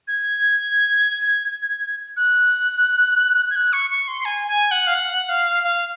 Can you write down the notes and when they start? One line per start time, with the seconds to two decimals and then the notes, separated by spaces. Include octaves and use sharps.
0.08 G#6
2.17 F#6
3.50 G#6
3.56 F#6
3.73 C#6
3.90 C#6
4.08 C6
4.25 G#5
4.48 G#5
4.71 F#5
4.87 F5
4.94 F#5
5.29 F5
5.64 F5